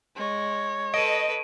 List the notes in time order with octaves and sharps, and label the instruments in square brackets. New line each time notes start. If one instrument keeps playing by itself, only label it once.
[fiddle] G#3 [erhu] C#5
[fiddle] A4 B4 [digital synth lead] D#5 [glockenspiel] D7 D#7